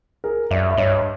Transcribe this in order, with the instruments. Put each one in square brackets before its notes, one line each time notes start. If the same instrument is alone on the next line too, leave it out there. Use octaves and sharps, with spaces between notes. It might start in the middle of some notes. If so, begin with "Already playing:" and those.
[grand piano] G#4 A#4
[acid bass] F#2 [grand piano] D5 E5
[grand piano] E5
[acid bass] G2 [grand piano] C#5 D#5